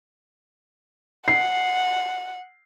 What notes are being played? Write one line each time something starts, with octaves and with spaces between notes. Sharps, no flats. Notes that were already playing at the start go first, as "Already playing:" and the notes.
F#5 C7